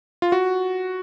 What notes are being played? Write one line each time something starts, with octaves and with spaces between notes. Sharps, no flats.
F4
F#4